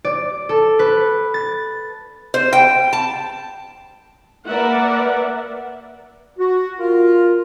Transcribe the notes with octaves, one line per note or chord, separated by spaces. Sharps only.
D5
A4
B4
A6
C5
G5
A5
A#3 A#4 B4 D5 E5 F#5
F#4
F4 A#4